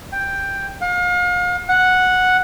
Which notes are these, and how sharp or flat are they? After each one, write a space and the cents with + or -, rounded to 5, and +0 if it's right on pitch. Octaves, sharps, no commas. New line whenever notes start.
G5 +5
F5 +40
F#5 -5